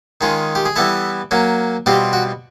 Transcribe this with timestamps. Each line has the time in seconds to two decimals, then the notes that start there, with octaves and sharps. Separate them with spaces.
0.21 D#3 G#3 C#4 F4
0.55 G4
0.65 G#4
0.76 E3 G3 B3 E4 A4
1.31 F#3 A#3 C#4
1.86 B2 G3 C4 F4 G4
2.13 F#4